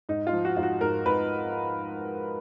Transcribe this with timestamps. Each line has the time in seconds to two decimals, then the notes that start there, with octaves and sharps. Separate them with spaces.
0.09 G#2 D#4
0.27 F4
0.33 F3
0.45 F#4
0.57 G#2 F4
0.63 F#4
0.81 G#2 A#4
1.06 G#2 B4